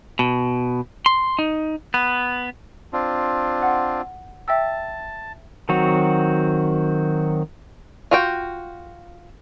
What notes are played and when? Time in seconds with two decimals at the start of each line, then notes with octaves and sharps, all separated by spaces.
0.19 B2
1.06 C6
1.39 D#4
1.94 B3
2.93 C4 D4 F4
3.62 F#5
4.48 E5 G5 A5 E6
5.69 D#3 F#3 C4 F#4
8.11 F4 F#4 G5